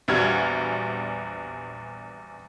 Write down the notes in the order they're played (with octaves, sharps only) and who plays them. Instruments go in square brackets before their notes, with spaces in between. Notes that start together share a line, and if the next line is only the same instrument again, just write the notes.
[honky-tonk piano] A#1 E2 G3 F#4 F6 G#6